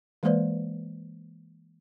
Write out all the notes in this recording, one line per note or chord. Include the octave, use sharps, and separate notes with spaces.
E3 G#3 A#3 B4 C5 D5